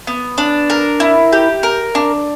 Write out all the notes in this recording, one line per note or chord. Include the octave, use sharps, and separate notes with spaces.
B3
D4
A#4
E4
G4
A#4
D4